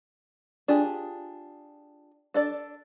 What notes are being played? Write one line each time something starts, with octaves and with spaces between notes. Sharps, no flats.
D4 F4 G4 G#4
D4 A4 D5